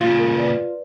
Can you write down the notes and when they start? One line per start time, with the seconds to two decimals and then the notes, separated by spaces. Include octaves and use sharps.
0.01 A#2 C#3 F4
0.19 A#4
0.35 B4 D5